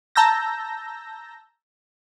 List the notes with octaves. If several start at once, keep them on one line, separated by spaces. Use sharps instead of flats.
A5 A#5 E6 G6 A#6